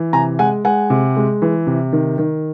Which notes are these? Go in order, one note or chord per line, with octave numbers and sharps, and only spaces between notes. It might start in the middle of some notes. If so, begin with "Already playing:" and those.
Already playing: E3
C3 G#5 A#5
G#3 F#5 G#5
G#3 F#5 G#5
C3
G#3
E3
C3
D#3
D#3